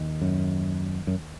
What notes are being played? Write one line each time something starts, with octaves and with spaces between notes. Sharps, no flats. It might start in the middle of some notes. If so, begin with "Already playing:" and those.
Already playing: D#2 D#3
F#2
F#2